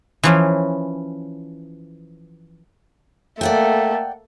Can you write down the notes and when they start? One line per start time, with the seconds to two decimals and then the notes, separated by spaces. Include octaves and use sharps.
0.23 E3 F3 C#4
3.41 A3 A#3 D5 F#5 G5